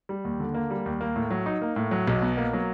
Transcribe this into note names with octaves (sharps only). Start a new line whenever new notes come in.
G3
D#2
D3
A#3
G3
D#2
A#3
A2
F#3
D#4
A#3
A2
F#3
B1
B2
A#3
F#3